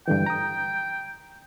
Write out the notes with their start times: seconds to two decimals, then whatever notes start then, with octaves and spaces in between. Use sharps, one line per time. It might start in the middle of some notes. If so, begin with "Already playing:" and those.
0.08 G2 D3 E3 G5
0.26 A#5 D#6